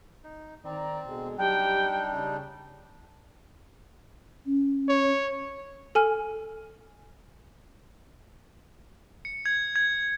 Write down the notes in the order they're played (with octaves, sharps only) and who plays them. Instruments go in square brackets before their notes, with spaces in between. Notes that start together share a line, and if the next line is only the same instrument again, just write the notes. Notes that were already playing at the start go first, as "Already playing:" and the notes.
[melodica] D#4
[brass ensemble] D#3 D5 A#5 [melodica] C4
[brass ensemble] B2 D3 G#3
[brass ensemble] F#3 G4 [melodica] G3 D4 D#4 [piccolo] G5
[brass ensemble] C#3
[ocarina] C#4
[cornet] C#5
[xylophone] A4 G#5 F6
[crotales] C#7
G#6
G#6